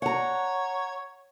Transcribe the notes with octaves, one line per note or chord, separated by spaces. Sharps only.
C#5 F#5 A#5